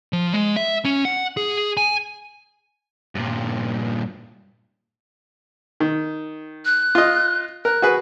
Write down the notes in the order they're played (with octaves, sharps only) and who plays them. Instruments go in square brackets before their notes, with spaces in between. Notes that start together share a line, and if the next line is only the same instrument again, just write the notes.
[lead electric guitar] F3
G#3
E5
C#4
F#5
G#4
G#5
[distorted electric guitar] G2 A#2
[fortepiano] D#3
[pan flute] F#6
[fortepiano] F4 D#5
[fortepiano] A#4 [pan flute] F#6
[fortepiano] F#4 G#4 B4